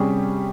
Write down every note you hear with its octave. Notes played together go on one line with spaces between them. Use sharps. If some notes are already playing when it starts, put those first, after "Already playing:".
Already playing: C3 G3 C#4 G#4